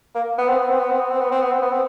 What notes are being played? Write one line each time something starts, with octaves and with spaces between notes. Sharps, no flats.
A#3
B3
C4
B3
C4
B3
C4
B3
C4
B3
C4
B3
C4
B3
C4